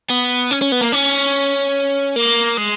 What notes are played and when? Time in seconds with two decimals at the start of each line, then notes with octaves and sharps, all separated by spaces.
0.10 B3
0.51 C#4
0.62 C#4
0.72 B3
0.81 A#3
0.92 C#4
2.16 A#3
2.57 G#3